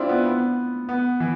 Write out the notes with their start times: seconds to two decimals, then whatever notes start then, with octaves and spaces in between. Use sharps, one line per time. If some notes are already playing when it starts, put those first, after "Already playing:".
Already playing: C4 D4 E4 F4
0.09 B3
0.25 B3
0.89 B3
1.20 E3